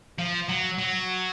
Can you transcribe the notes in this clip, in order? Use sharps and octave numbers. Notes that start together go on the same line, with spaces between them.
F3
F#3
F#3